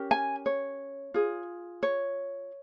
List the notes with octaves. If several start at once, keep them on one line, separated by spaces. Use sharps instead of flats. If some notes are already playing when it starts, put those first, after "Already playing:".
Already playing: C#4 G4 A#4
G#5
C#5
F4 G#4
C#5